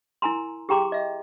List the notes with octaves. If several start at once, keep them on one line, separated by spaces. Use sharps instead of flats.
E4 A#4 G#5 A#5 C6
G4 G#4 G5 A#5 C6 D6
D#5 E5